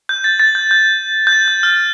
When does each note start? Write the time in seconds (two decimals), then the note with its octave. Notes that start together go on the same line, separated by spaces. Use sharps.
0.09 G6
0.24 A6
0.40 A6
0.55 G6
0.71 G6
1.27 G6
1.32 A6
1.48 G6
1.63 F6